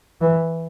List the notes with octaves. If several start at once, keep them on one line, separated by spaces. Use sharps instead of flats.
E3